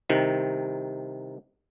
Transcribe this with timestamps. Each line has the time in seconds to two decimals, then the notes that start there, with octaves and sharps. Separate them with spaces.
0.09 C2 C3 D#3